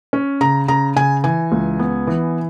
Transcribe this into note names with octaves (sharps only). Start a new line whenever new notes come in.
C#4
C#3 A#5
C#3 A#5
C#3 G#5
E3 G#5
C#2
B3
E3